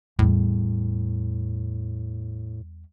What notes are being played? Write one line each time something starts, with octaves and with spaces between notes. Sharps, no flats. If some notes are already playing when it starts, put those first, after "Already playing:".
E2 A2 G3